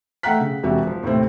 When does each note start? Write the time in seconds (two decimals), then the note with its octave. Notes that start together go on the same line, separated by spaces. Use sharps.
0.23 A3 F#5 G5 A#5 F#6 B6
0.41 C#3
0.63 E1 C3 F#4 G4 E5
0.87 F3
1.03 D#2 A2 C3 C4